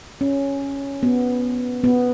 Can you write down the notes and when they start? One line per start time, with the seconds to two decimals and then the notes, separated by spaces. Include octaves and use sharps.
0.21 C#4
1.03 B3
1.84 B3